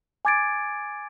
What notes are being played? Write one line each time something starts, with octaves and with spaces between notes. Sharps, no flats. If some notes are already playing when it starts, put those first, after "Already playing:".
G#5 D6 G#6 A6 D7